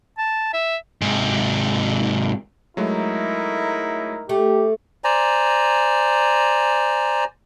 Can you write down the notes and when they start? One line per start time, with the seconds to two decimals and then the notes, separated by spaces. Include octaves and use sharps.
0.18 A5
0.54 E5
1.02 G#2 C3
2.77 F#3 G#3 A3 D#4 E4 A#4
4.29 A3 G4
5.04 C5 D5 G#5 A#5